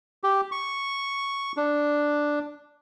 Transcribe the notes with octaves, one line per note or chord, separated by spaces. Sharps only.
G4
C#6
D4